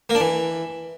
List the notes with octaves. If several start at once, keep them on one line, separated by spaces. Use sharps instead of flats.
A#3
D4
E3